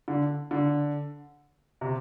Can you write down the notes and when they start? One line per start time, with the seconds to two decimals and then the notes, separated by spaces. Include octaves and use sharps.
0.08 D3
0.51 D3
1.81 C3